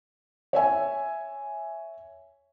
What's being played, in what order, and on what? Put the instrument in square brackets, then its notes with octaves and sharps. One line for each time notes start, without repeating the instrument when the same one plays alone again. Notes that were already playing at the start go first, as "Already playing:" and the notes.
[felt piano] C#5 E5 G#5